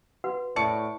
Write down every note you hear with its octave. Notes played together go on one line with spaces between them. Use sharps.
F#4 B4 F#5
A2 D5 A5 C#6 C#7